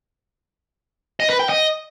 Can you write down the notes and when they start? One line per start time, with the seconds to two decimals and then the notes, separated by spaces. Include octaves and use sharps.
1.20 D#5
1.30 B4
1.39 G5
1.49 D#5